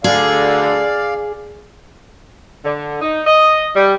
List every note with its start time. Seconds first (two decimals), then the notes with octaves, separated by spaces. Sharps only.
0.04 D2 D3 G#4 D5 F5
2.64 D3
3.01 D#4
3.27 D#5
3.76 G3